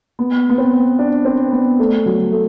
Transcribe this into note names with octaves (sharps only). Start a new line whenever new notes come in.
B3
B3
C4
D4
C4
B3
A3
F#3
A3